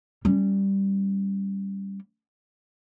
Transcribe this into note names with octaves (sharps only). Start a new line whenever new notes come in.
G3 C#4